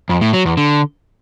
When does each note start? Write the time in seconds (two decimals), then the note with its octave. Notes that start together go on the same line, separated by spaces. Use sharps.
0.09 F2
0.21 A2
0.33 F#3
0.45 E2
0.57 D3